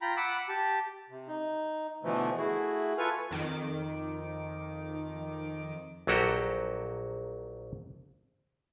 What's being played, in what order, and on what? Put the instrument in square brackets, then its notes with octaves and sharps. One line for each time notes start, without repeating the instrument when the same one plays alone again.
[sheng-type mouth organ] F4 G5 A#5 B5
F#5 B5 D6 E6
G4 A5
[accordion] C3
D#4
B2 D3 E3 F3 A3
A3 E4 F#4 G#4
F4 A4 B4 G#5 C#6 F6
[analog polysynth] F2 D#3 D6
[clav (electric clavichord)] A#1 F#3 A#3 F#4 G4 A4